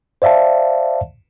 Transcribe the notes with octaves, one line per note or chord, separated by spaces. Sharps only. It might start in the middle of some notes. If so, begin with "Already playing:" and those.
C5 D5 E5 F5 A5